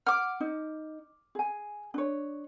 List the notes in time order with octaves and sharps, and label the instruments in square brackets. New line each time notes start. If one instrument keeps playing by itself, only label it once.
[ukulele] F#5 [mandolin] D6 F6
[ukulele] D#4
G#4 G#5
D4 C#5